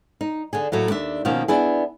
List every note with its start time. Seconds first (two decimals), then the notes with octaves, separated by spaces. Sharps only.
0.21 D#4
0.53 D3 D4 G#4
0.72 A2 F#3 A3 A#3
0.90 D#2 D4 E5
1.25 B2 D#3 F3 A#3 C#4
1.48 B3 D4 E4 G#4